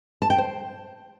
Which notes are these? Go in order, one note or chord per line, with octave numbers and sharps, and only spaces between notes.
A5
G5
C5